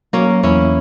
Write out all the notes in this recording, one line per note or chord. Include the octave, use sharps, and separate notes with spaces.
F#3 A#3 C#4
E2 C#4 E4